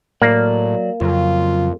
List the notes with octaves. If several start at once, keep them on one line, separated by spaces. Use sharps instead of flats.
A2 F#3 A#3 D5
F2 C#3 F#3 F4